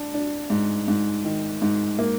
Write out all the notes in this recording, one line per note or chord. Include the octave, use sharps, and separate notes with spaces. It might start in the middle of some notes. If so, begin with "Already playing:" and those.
Already playing: D4
D4
G#2
G#2
D#3
G#2
A#3